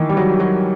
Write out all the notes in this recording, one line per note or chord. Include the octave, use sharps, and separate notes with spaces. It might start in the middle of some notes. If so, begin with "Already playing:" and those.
Already playing: D#3 E3
G3
F#3
F#3